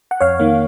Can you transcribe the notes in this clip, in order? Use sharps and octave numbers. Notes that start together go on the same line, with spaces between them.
F#5
F2 C#5 F5
D#3 A#3